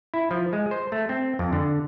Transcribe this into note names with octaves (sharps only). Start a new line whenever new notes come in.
E4
F3
G#3
C5
A3
C4
F2
D3